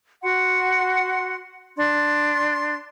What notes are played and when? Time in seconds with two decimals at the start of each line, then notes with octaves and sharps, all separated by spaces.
0.23 F#4 F#5 C6
1.78 D4 C6